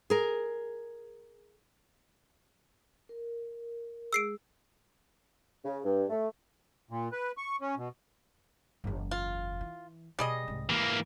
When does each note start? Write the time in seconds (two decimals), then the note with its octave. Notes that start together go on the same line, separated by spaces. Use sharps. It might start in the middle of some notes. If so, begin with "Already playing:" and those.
0.10 G#4 A#4
3.09 A#4
4.13 G#3 G#4 E6 C7 D7
5.64 C#3
5.84 G2
6.09 A3
6.90 A#2
7.12 B4
7.37 C#6
7.61 C#4
7.77 B2
8.84 F#1 E2
9.11 F4
9.61 E3
10.19 B2 G3 G#4 D#5
10.48 C2 G#2
10.69 G#2 E3 A#3